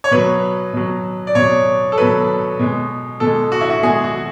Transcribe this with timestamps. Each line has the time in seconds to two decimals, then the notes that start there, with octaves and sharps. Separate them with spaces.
0.04 C#5
0.11 B2 F#3 B4
0.73 B2 F#3
1.27 D5
1.35 B2 F#3 C#5
1.92 A4
1.98 B2 F#3 B4
2.59 B2 G#3
3.20 B2 G#3 A4
3.52 F#4
3.61 E4
3.70 F#4
3.83 B2 G#3 G#4
4.04 F#4